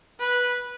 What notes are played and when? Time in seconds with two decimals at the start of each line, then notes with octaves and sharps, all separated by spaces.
0.20 B4